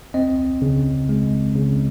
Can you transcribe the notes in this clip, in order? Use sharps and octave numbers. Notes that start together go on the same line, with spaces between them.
C4 D#5
C#3
G#3
C#3